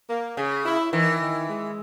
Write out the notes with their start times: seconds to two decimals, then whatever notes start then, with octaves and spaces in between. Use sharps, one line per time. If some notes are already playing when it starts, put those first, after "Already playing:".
0.10 A#3
0.37 C#3 G#4
0.65 E4
0.92 D#3 E3
1.20 D#3
1.48 G#3